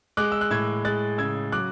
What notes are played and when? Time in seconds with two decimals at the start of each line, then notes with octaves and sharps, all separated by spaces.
0.17 G#3 D6 F#6
0.32 E6
0.41 F#6
0.51 A2 E6 G#6
0.85 G#3 F#6 A6
1.18 C#3 E6 G#6
1.52 F#3 D6 F#6